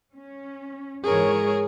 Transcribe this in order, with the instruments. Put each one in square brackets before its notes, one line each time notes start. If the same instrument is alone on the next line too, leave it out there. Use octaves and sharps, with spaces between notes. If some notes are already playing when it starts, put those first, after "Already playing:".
[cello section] C#4
[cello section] G#2 E3 C#5 [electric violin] G#4 A#4